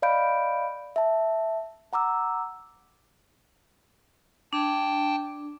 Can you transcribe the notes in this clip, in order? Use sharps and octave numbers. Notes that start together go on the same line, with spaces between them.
D5 D#5 F5 B5 G6 D7
E5 A5
F#5 A#5 D6 E6
D4 G5 A5